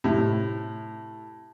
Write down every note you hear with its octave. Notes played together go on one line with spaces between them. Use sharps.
A2 C3